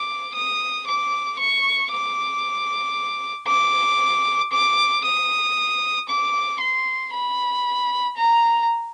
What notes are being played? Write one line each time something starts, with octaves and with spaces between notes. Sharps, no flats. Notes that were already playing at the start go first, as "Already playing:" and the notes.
Already playing: D6
D#6
D6
C#6
D6
D6
D6
D#6
D6
C6
B5
A#5